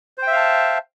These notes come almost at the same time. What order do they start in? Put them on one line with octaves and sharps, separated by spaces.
C5 G5 E5 F5 A5